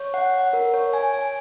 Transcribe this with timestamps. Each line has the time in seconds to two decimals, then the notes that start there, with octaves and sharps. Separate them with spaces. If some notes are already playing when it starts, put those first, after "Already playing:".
Already playing: C#5
0.14 F#5
0.34 F#5
0.53 A#4
0.74 C#5
0.93 G#5
1.14 G#5